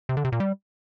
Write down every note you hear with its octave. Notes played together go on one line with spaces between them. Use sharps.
C3
D3
C3
A#2
G3